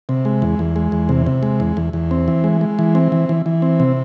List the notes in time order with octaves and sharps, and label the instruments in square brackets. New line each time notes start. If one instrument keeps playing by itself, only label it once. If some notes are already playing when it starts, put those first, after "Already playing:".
[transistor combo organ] C3
G#3
E2
E2
G#3
E2
C3
C3
G#3
E2
E2
E2
C4
E3
G#3
G#3
E3
C4
E3
E3
E3
C4
C3